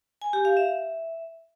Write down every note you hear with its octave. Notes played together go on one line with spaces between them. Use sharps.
G#5
G4
F5
E5